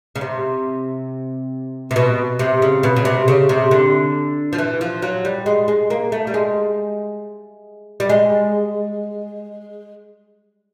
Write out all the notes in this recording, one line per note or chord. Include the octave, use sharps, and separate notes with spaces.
C#3
C3
C3
B2
C3
C#3
B2
C#3
C3
C#3
C3
D3
F3
E3
F3
F#3
G3
G#3
G#3
A#3
A3
G3
G#3
G3
G#3